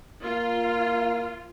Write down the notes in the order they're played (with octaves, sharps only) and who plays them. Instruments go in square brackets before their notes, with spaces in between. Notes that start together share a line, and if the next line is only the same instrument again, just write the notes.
[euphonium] A#3 [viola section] F4